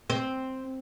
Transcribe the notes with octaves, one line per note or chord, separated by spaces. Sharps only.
C4